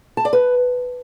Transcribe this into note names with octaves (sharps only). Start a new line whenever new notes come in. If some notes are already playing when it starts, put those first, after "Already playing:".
A5
D5
B4